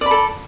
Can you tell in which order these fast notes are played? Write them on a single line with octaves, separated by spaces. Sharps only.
D5 B5 A4